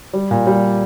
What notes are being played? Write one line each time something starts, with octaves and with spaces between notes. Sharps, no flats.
G3
A#2
G3